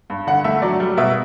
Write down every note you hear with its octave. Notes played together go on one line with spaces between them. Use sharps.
G2
D3 F#5
A3 E5
F#3 D5
G3
B2 E5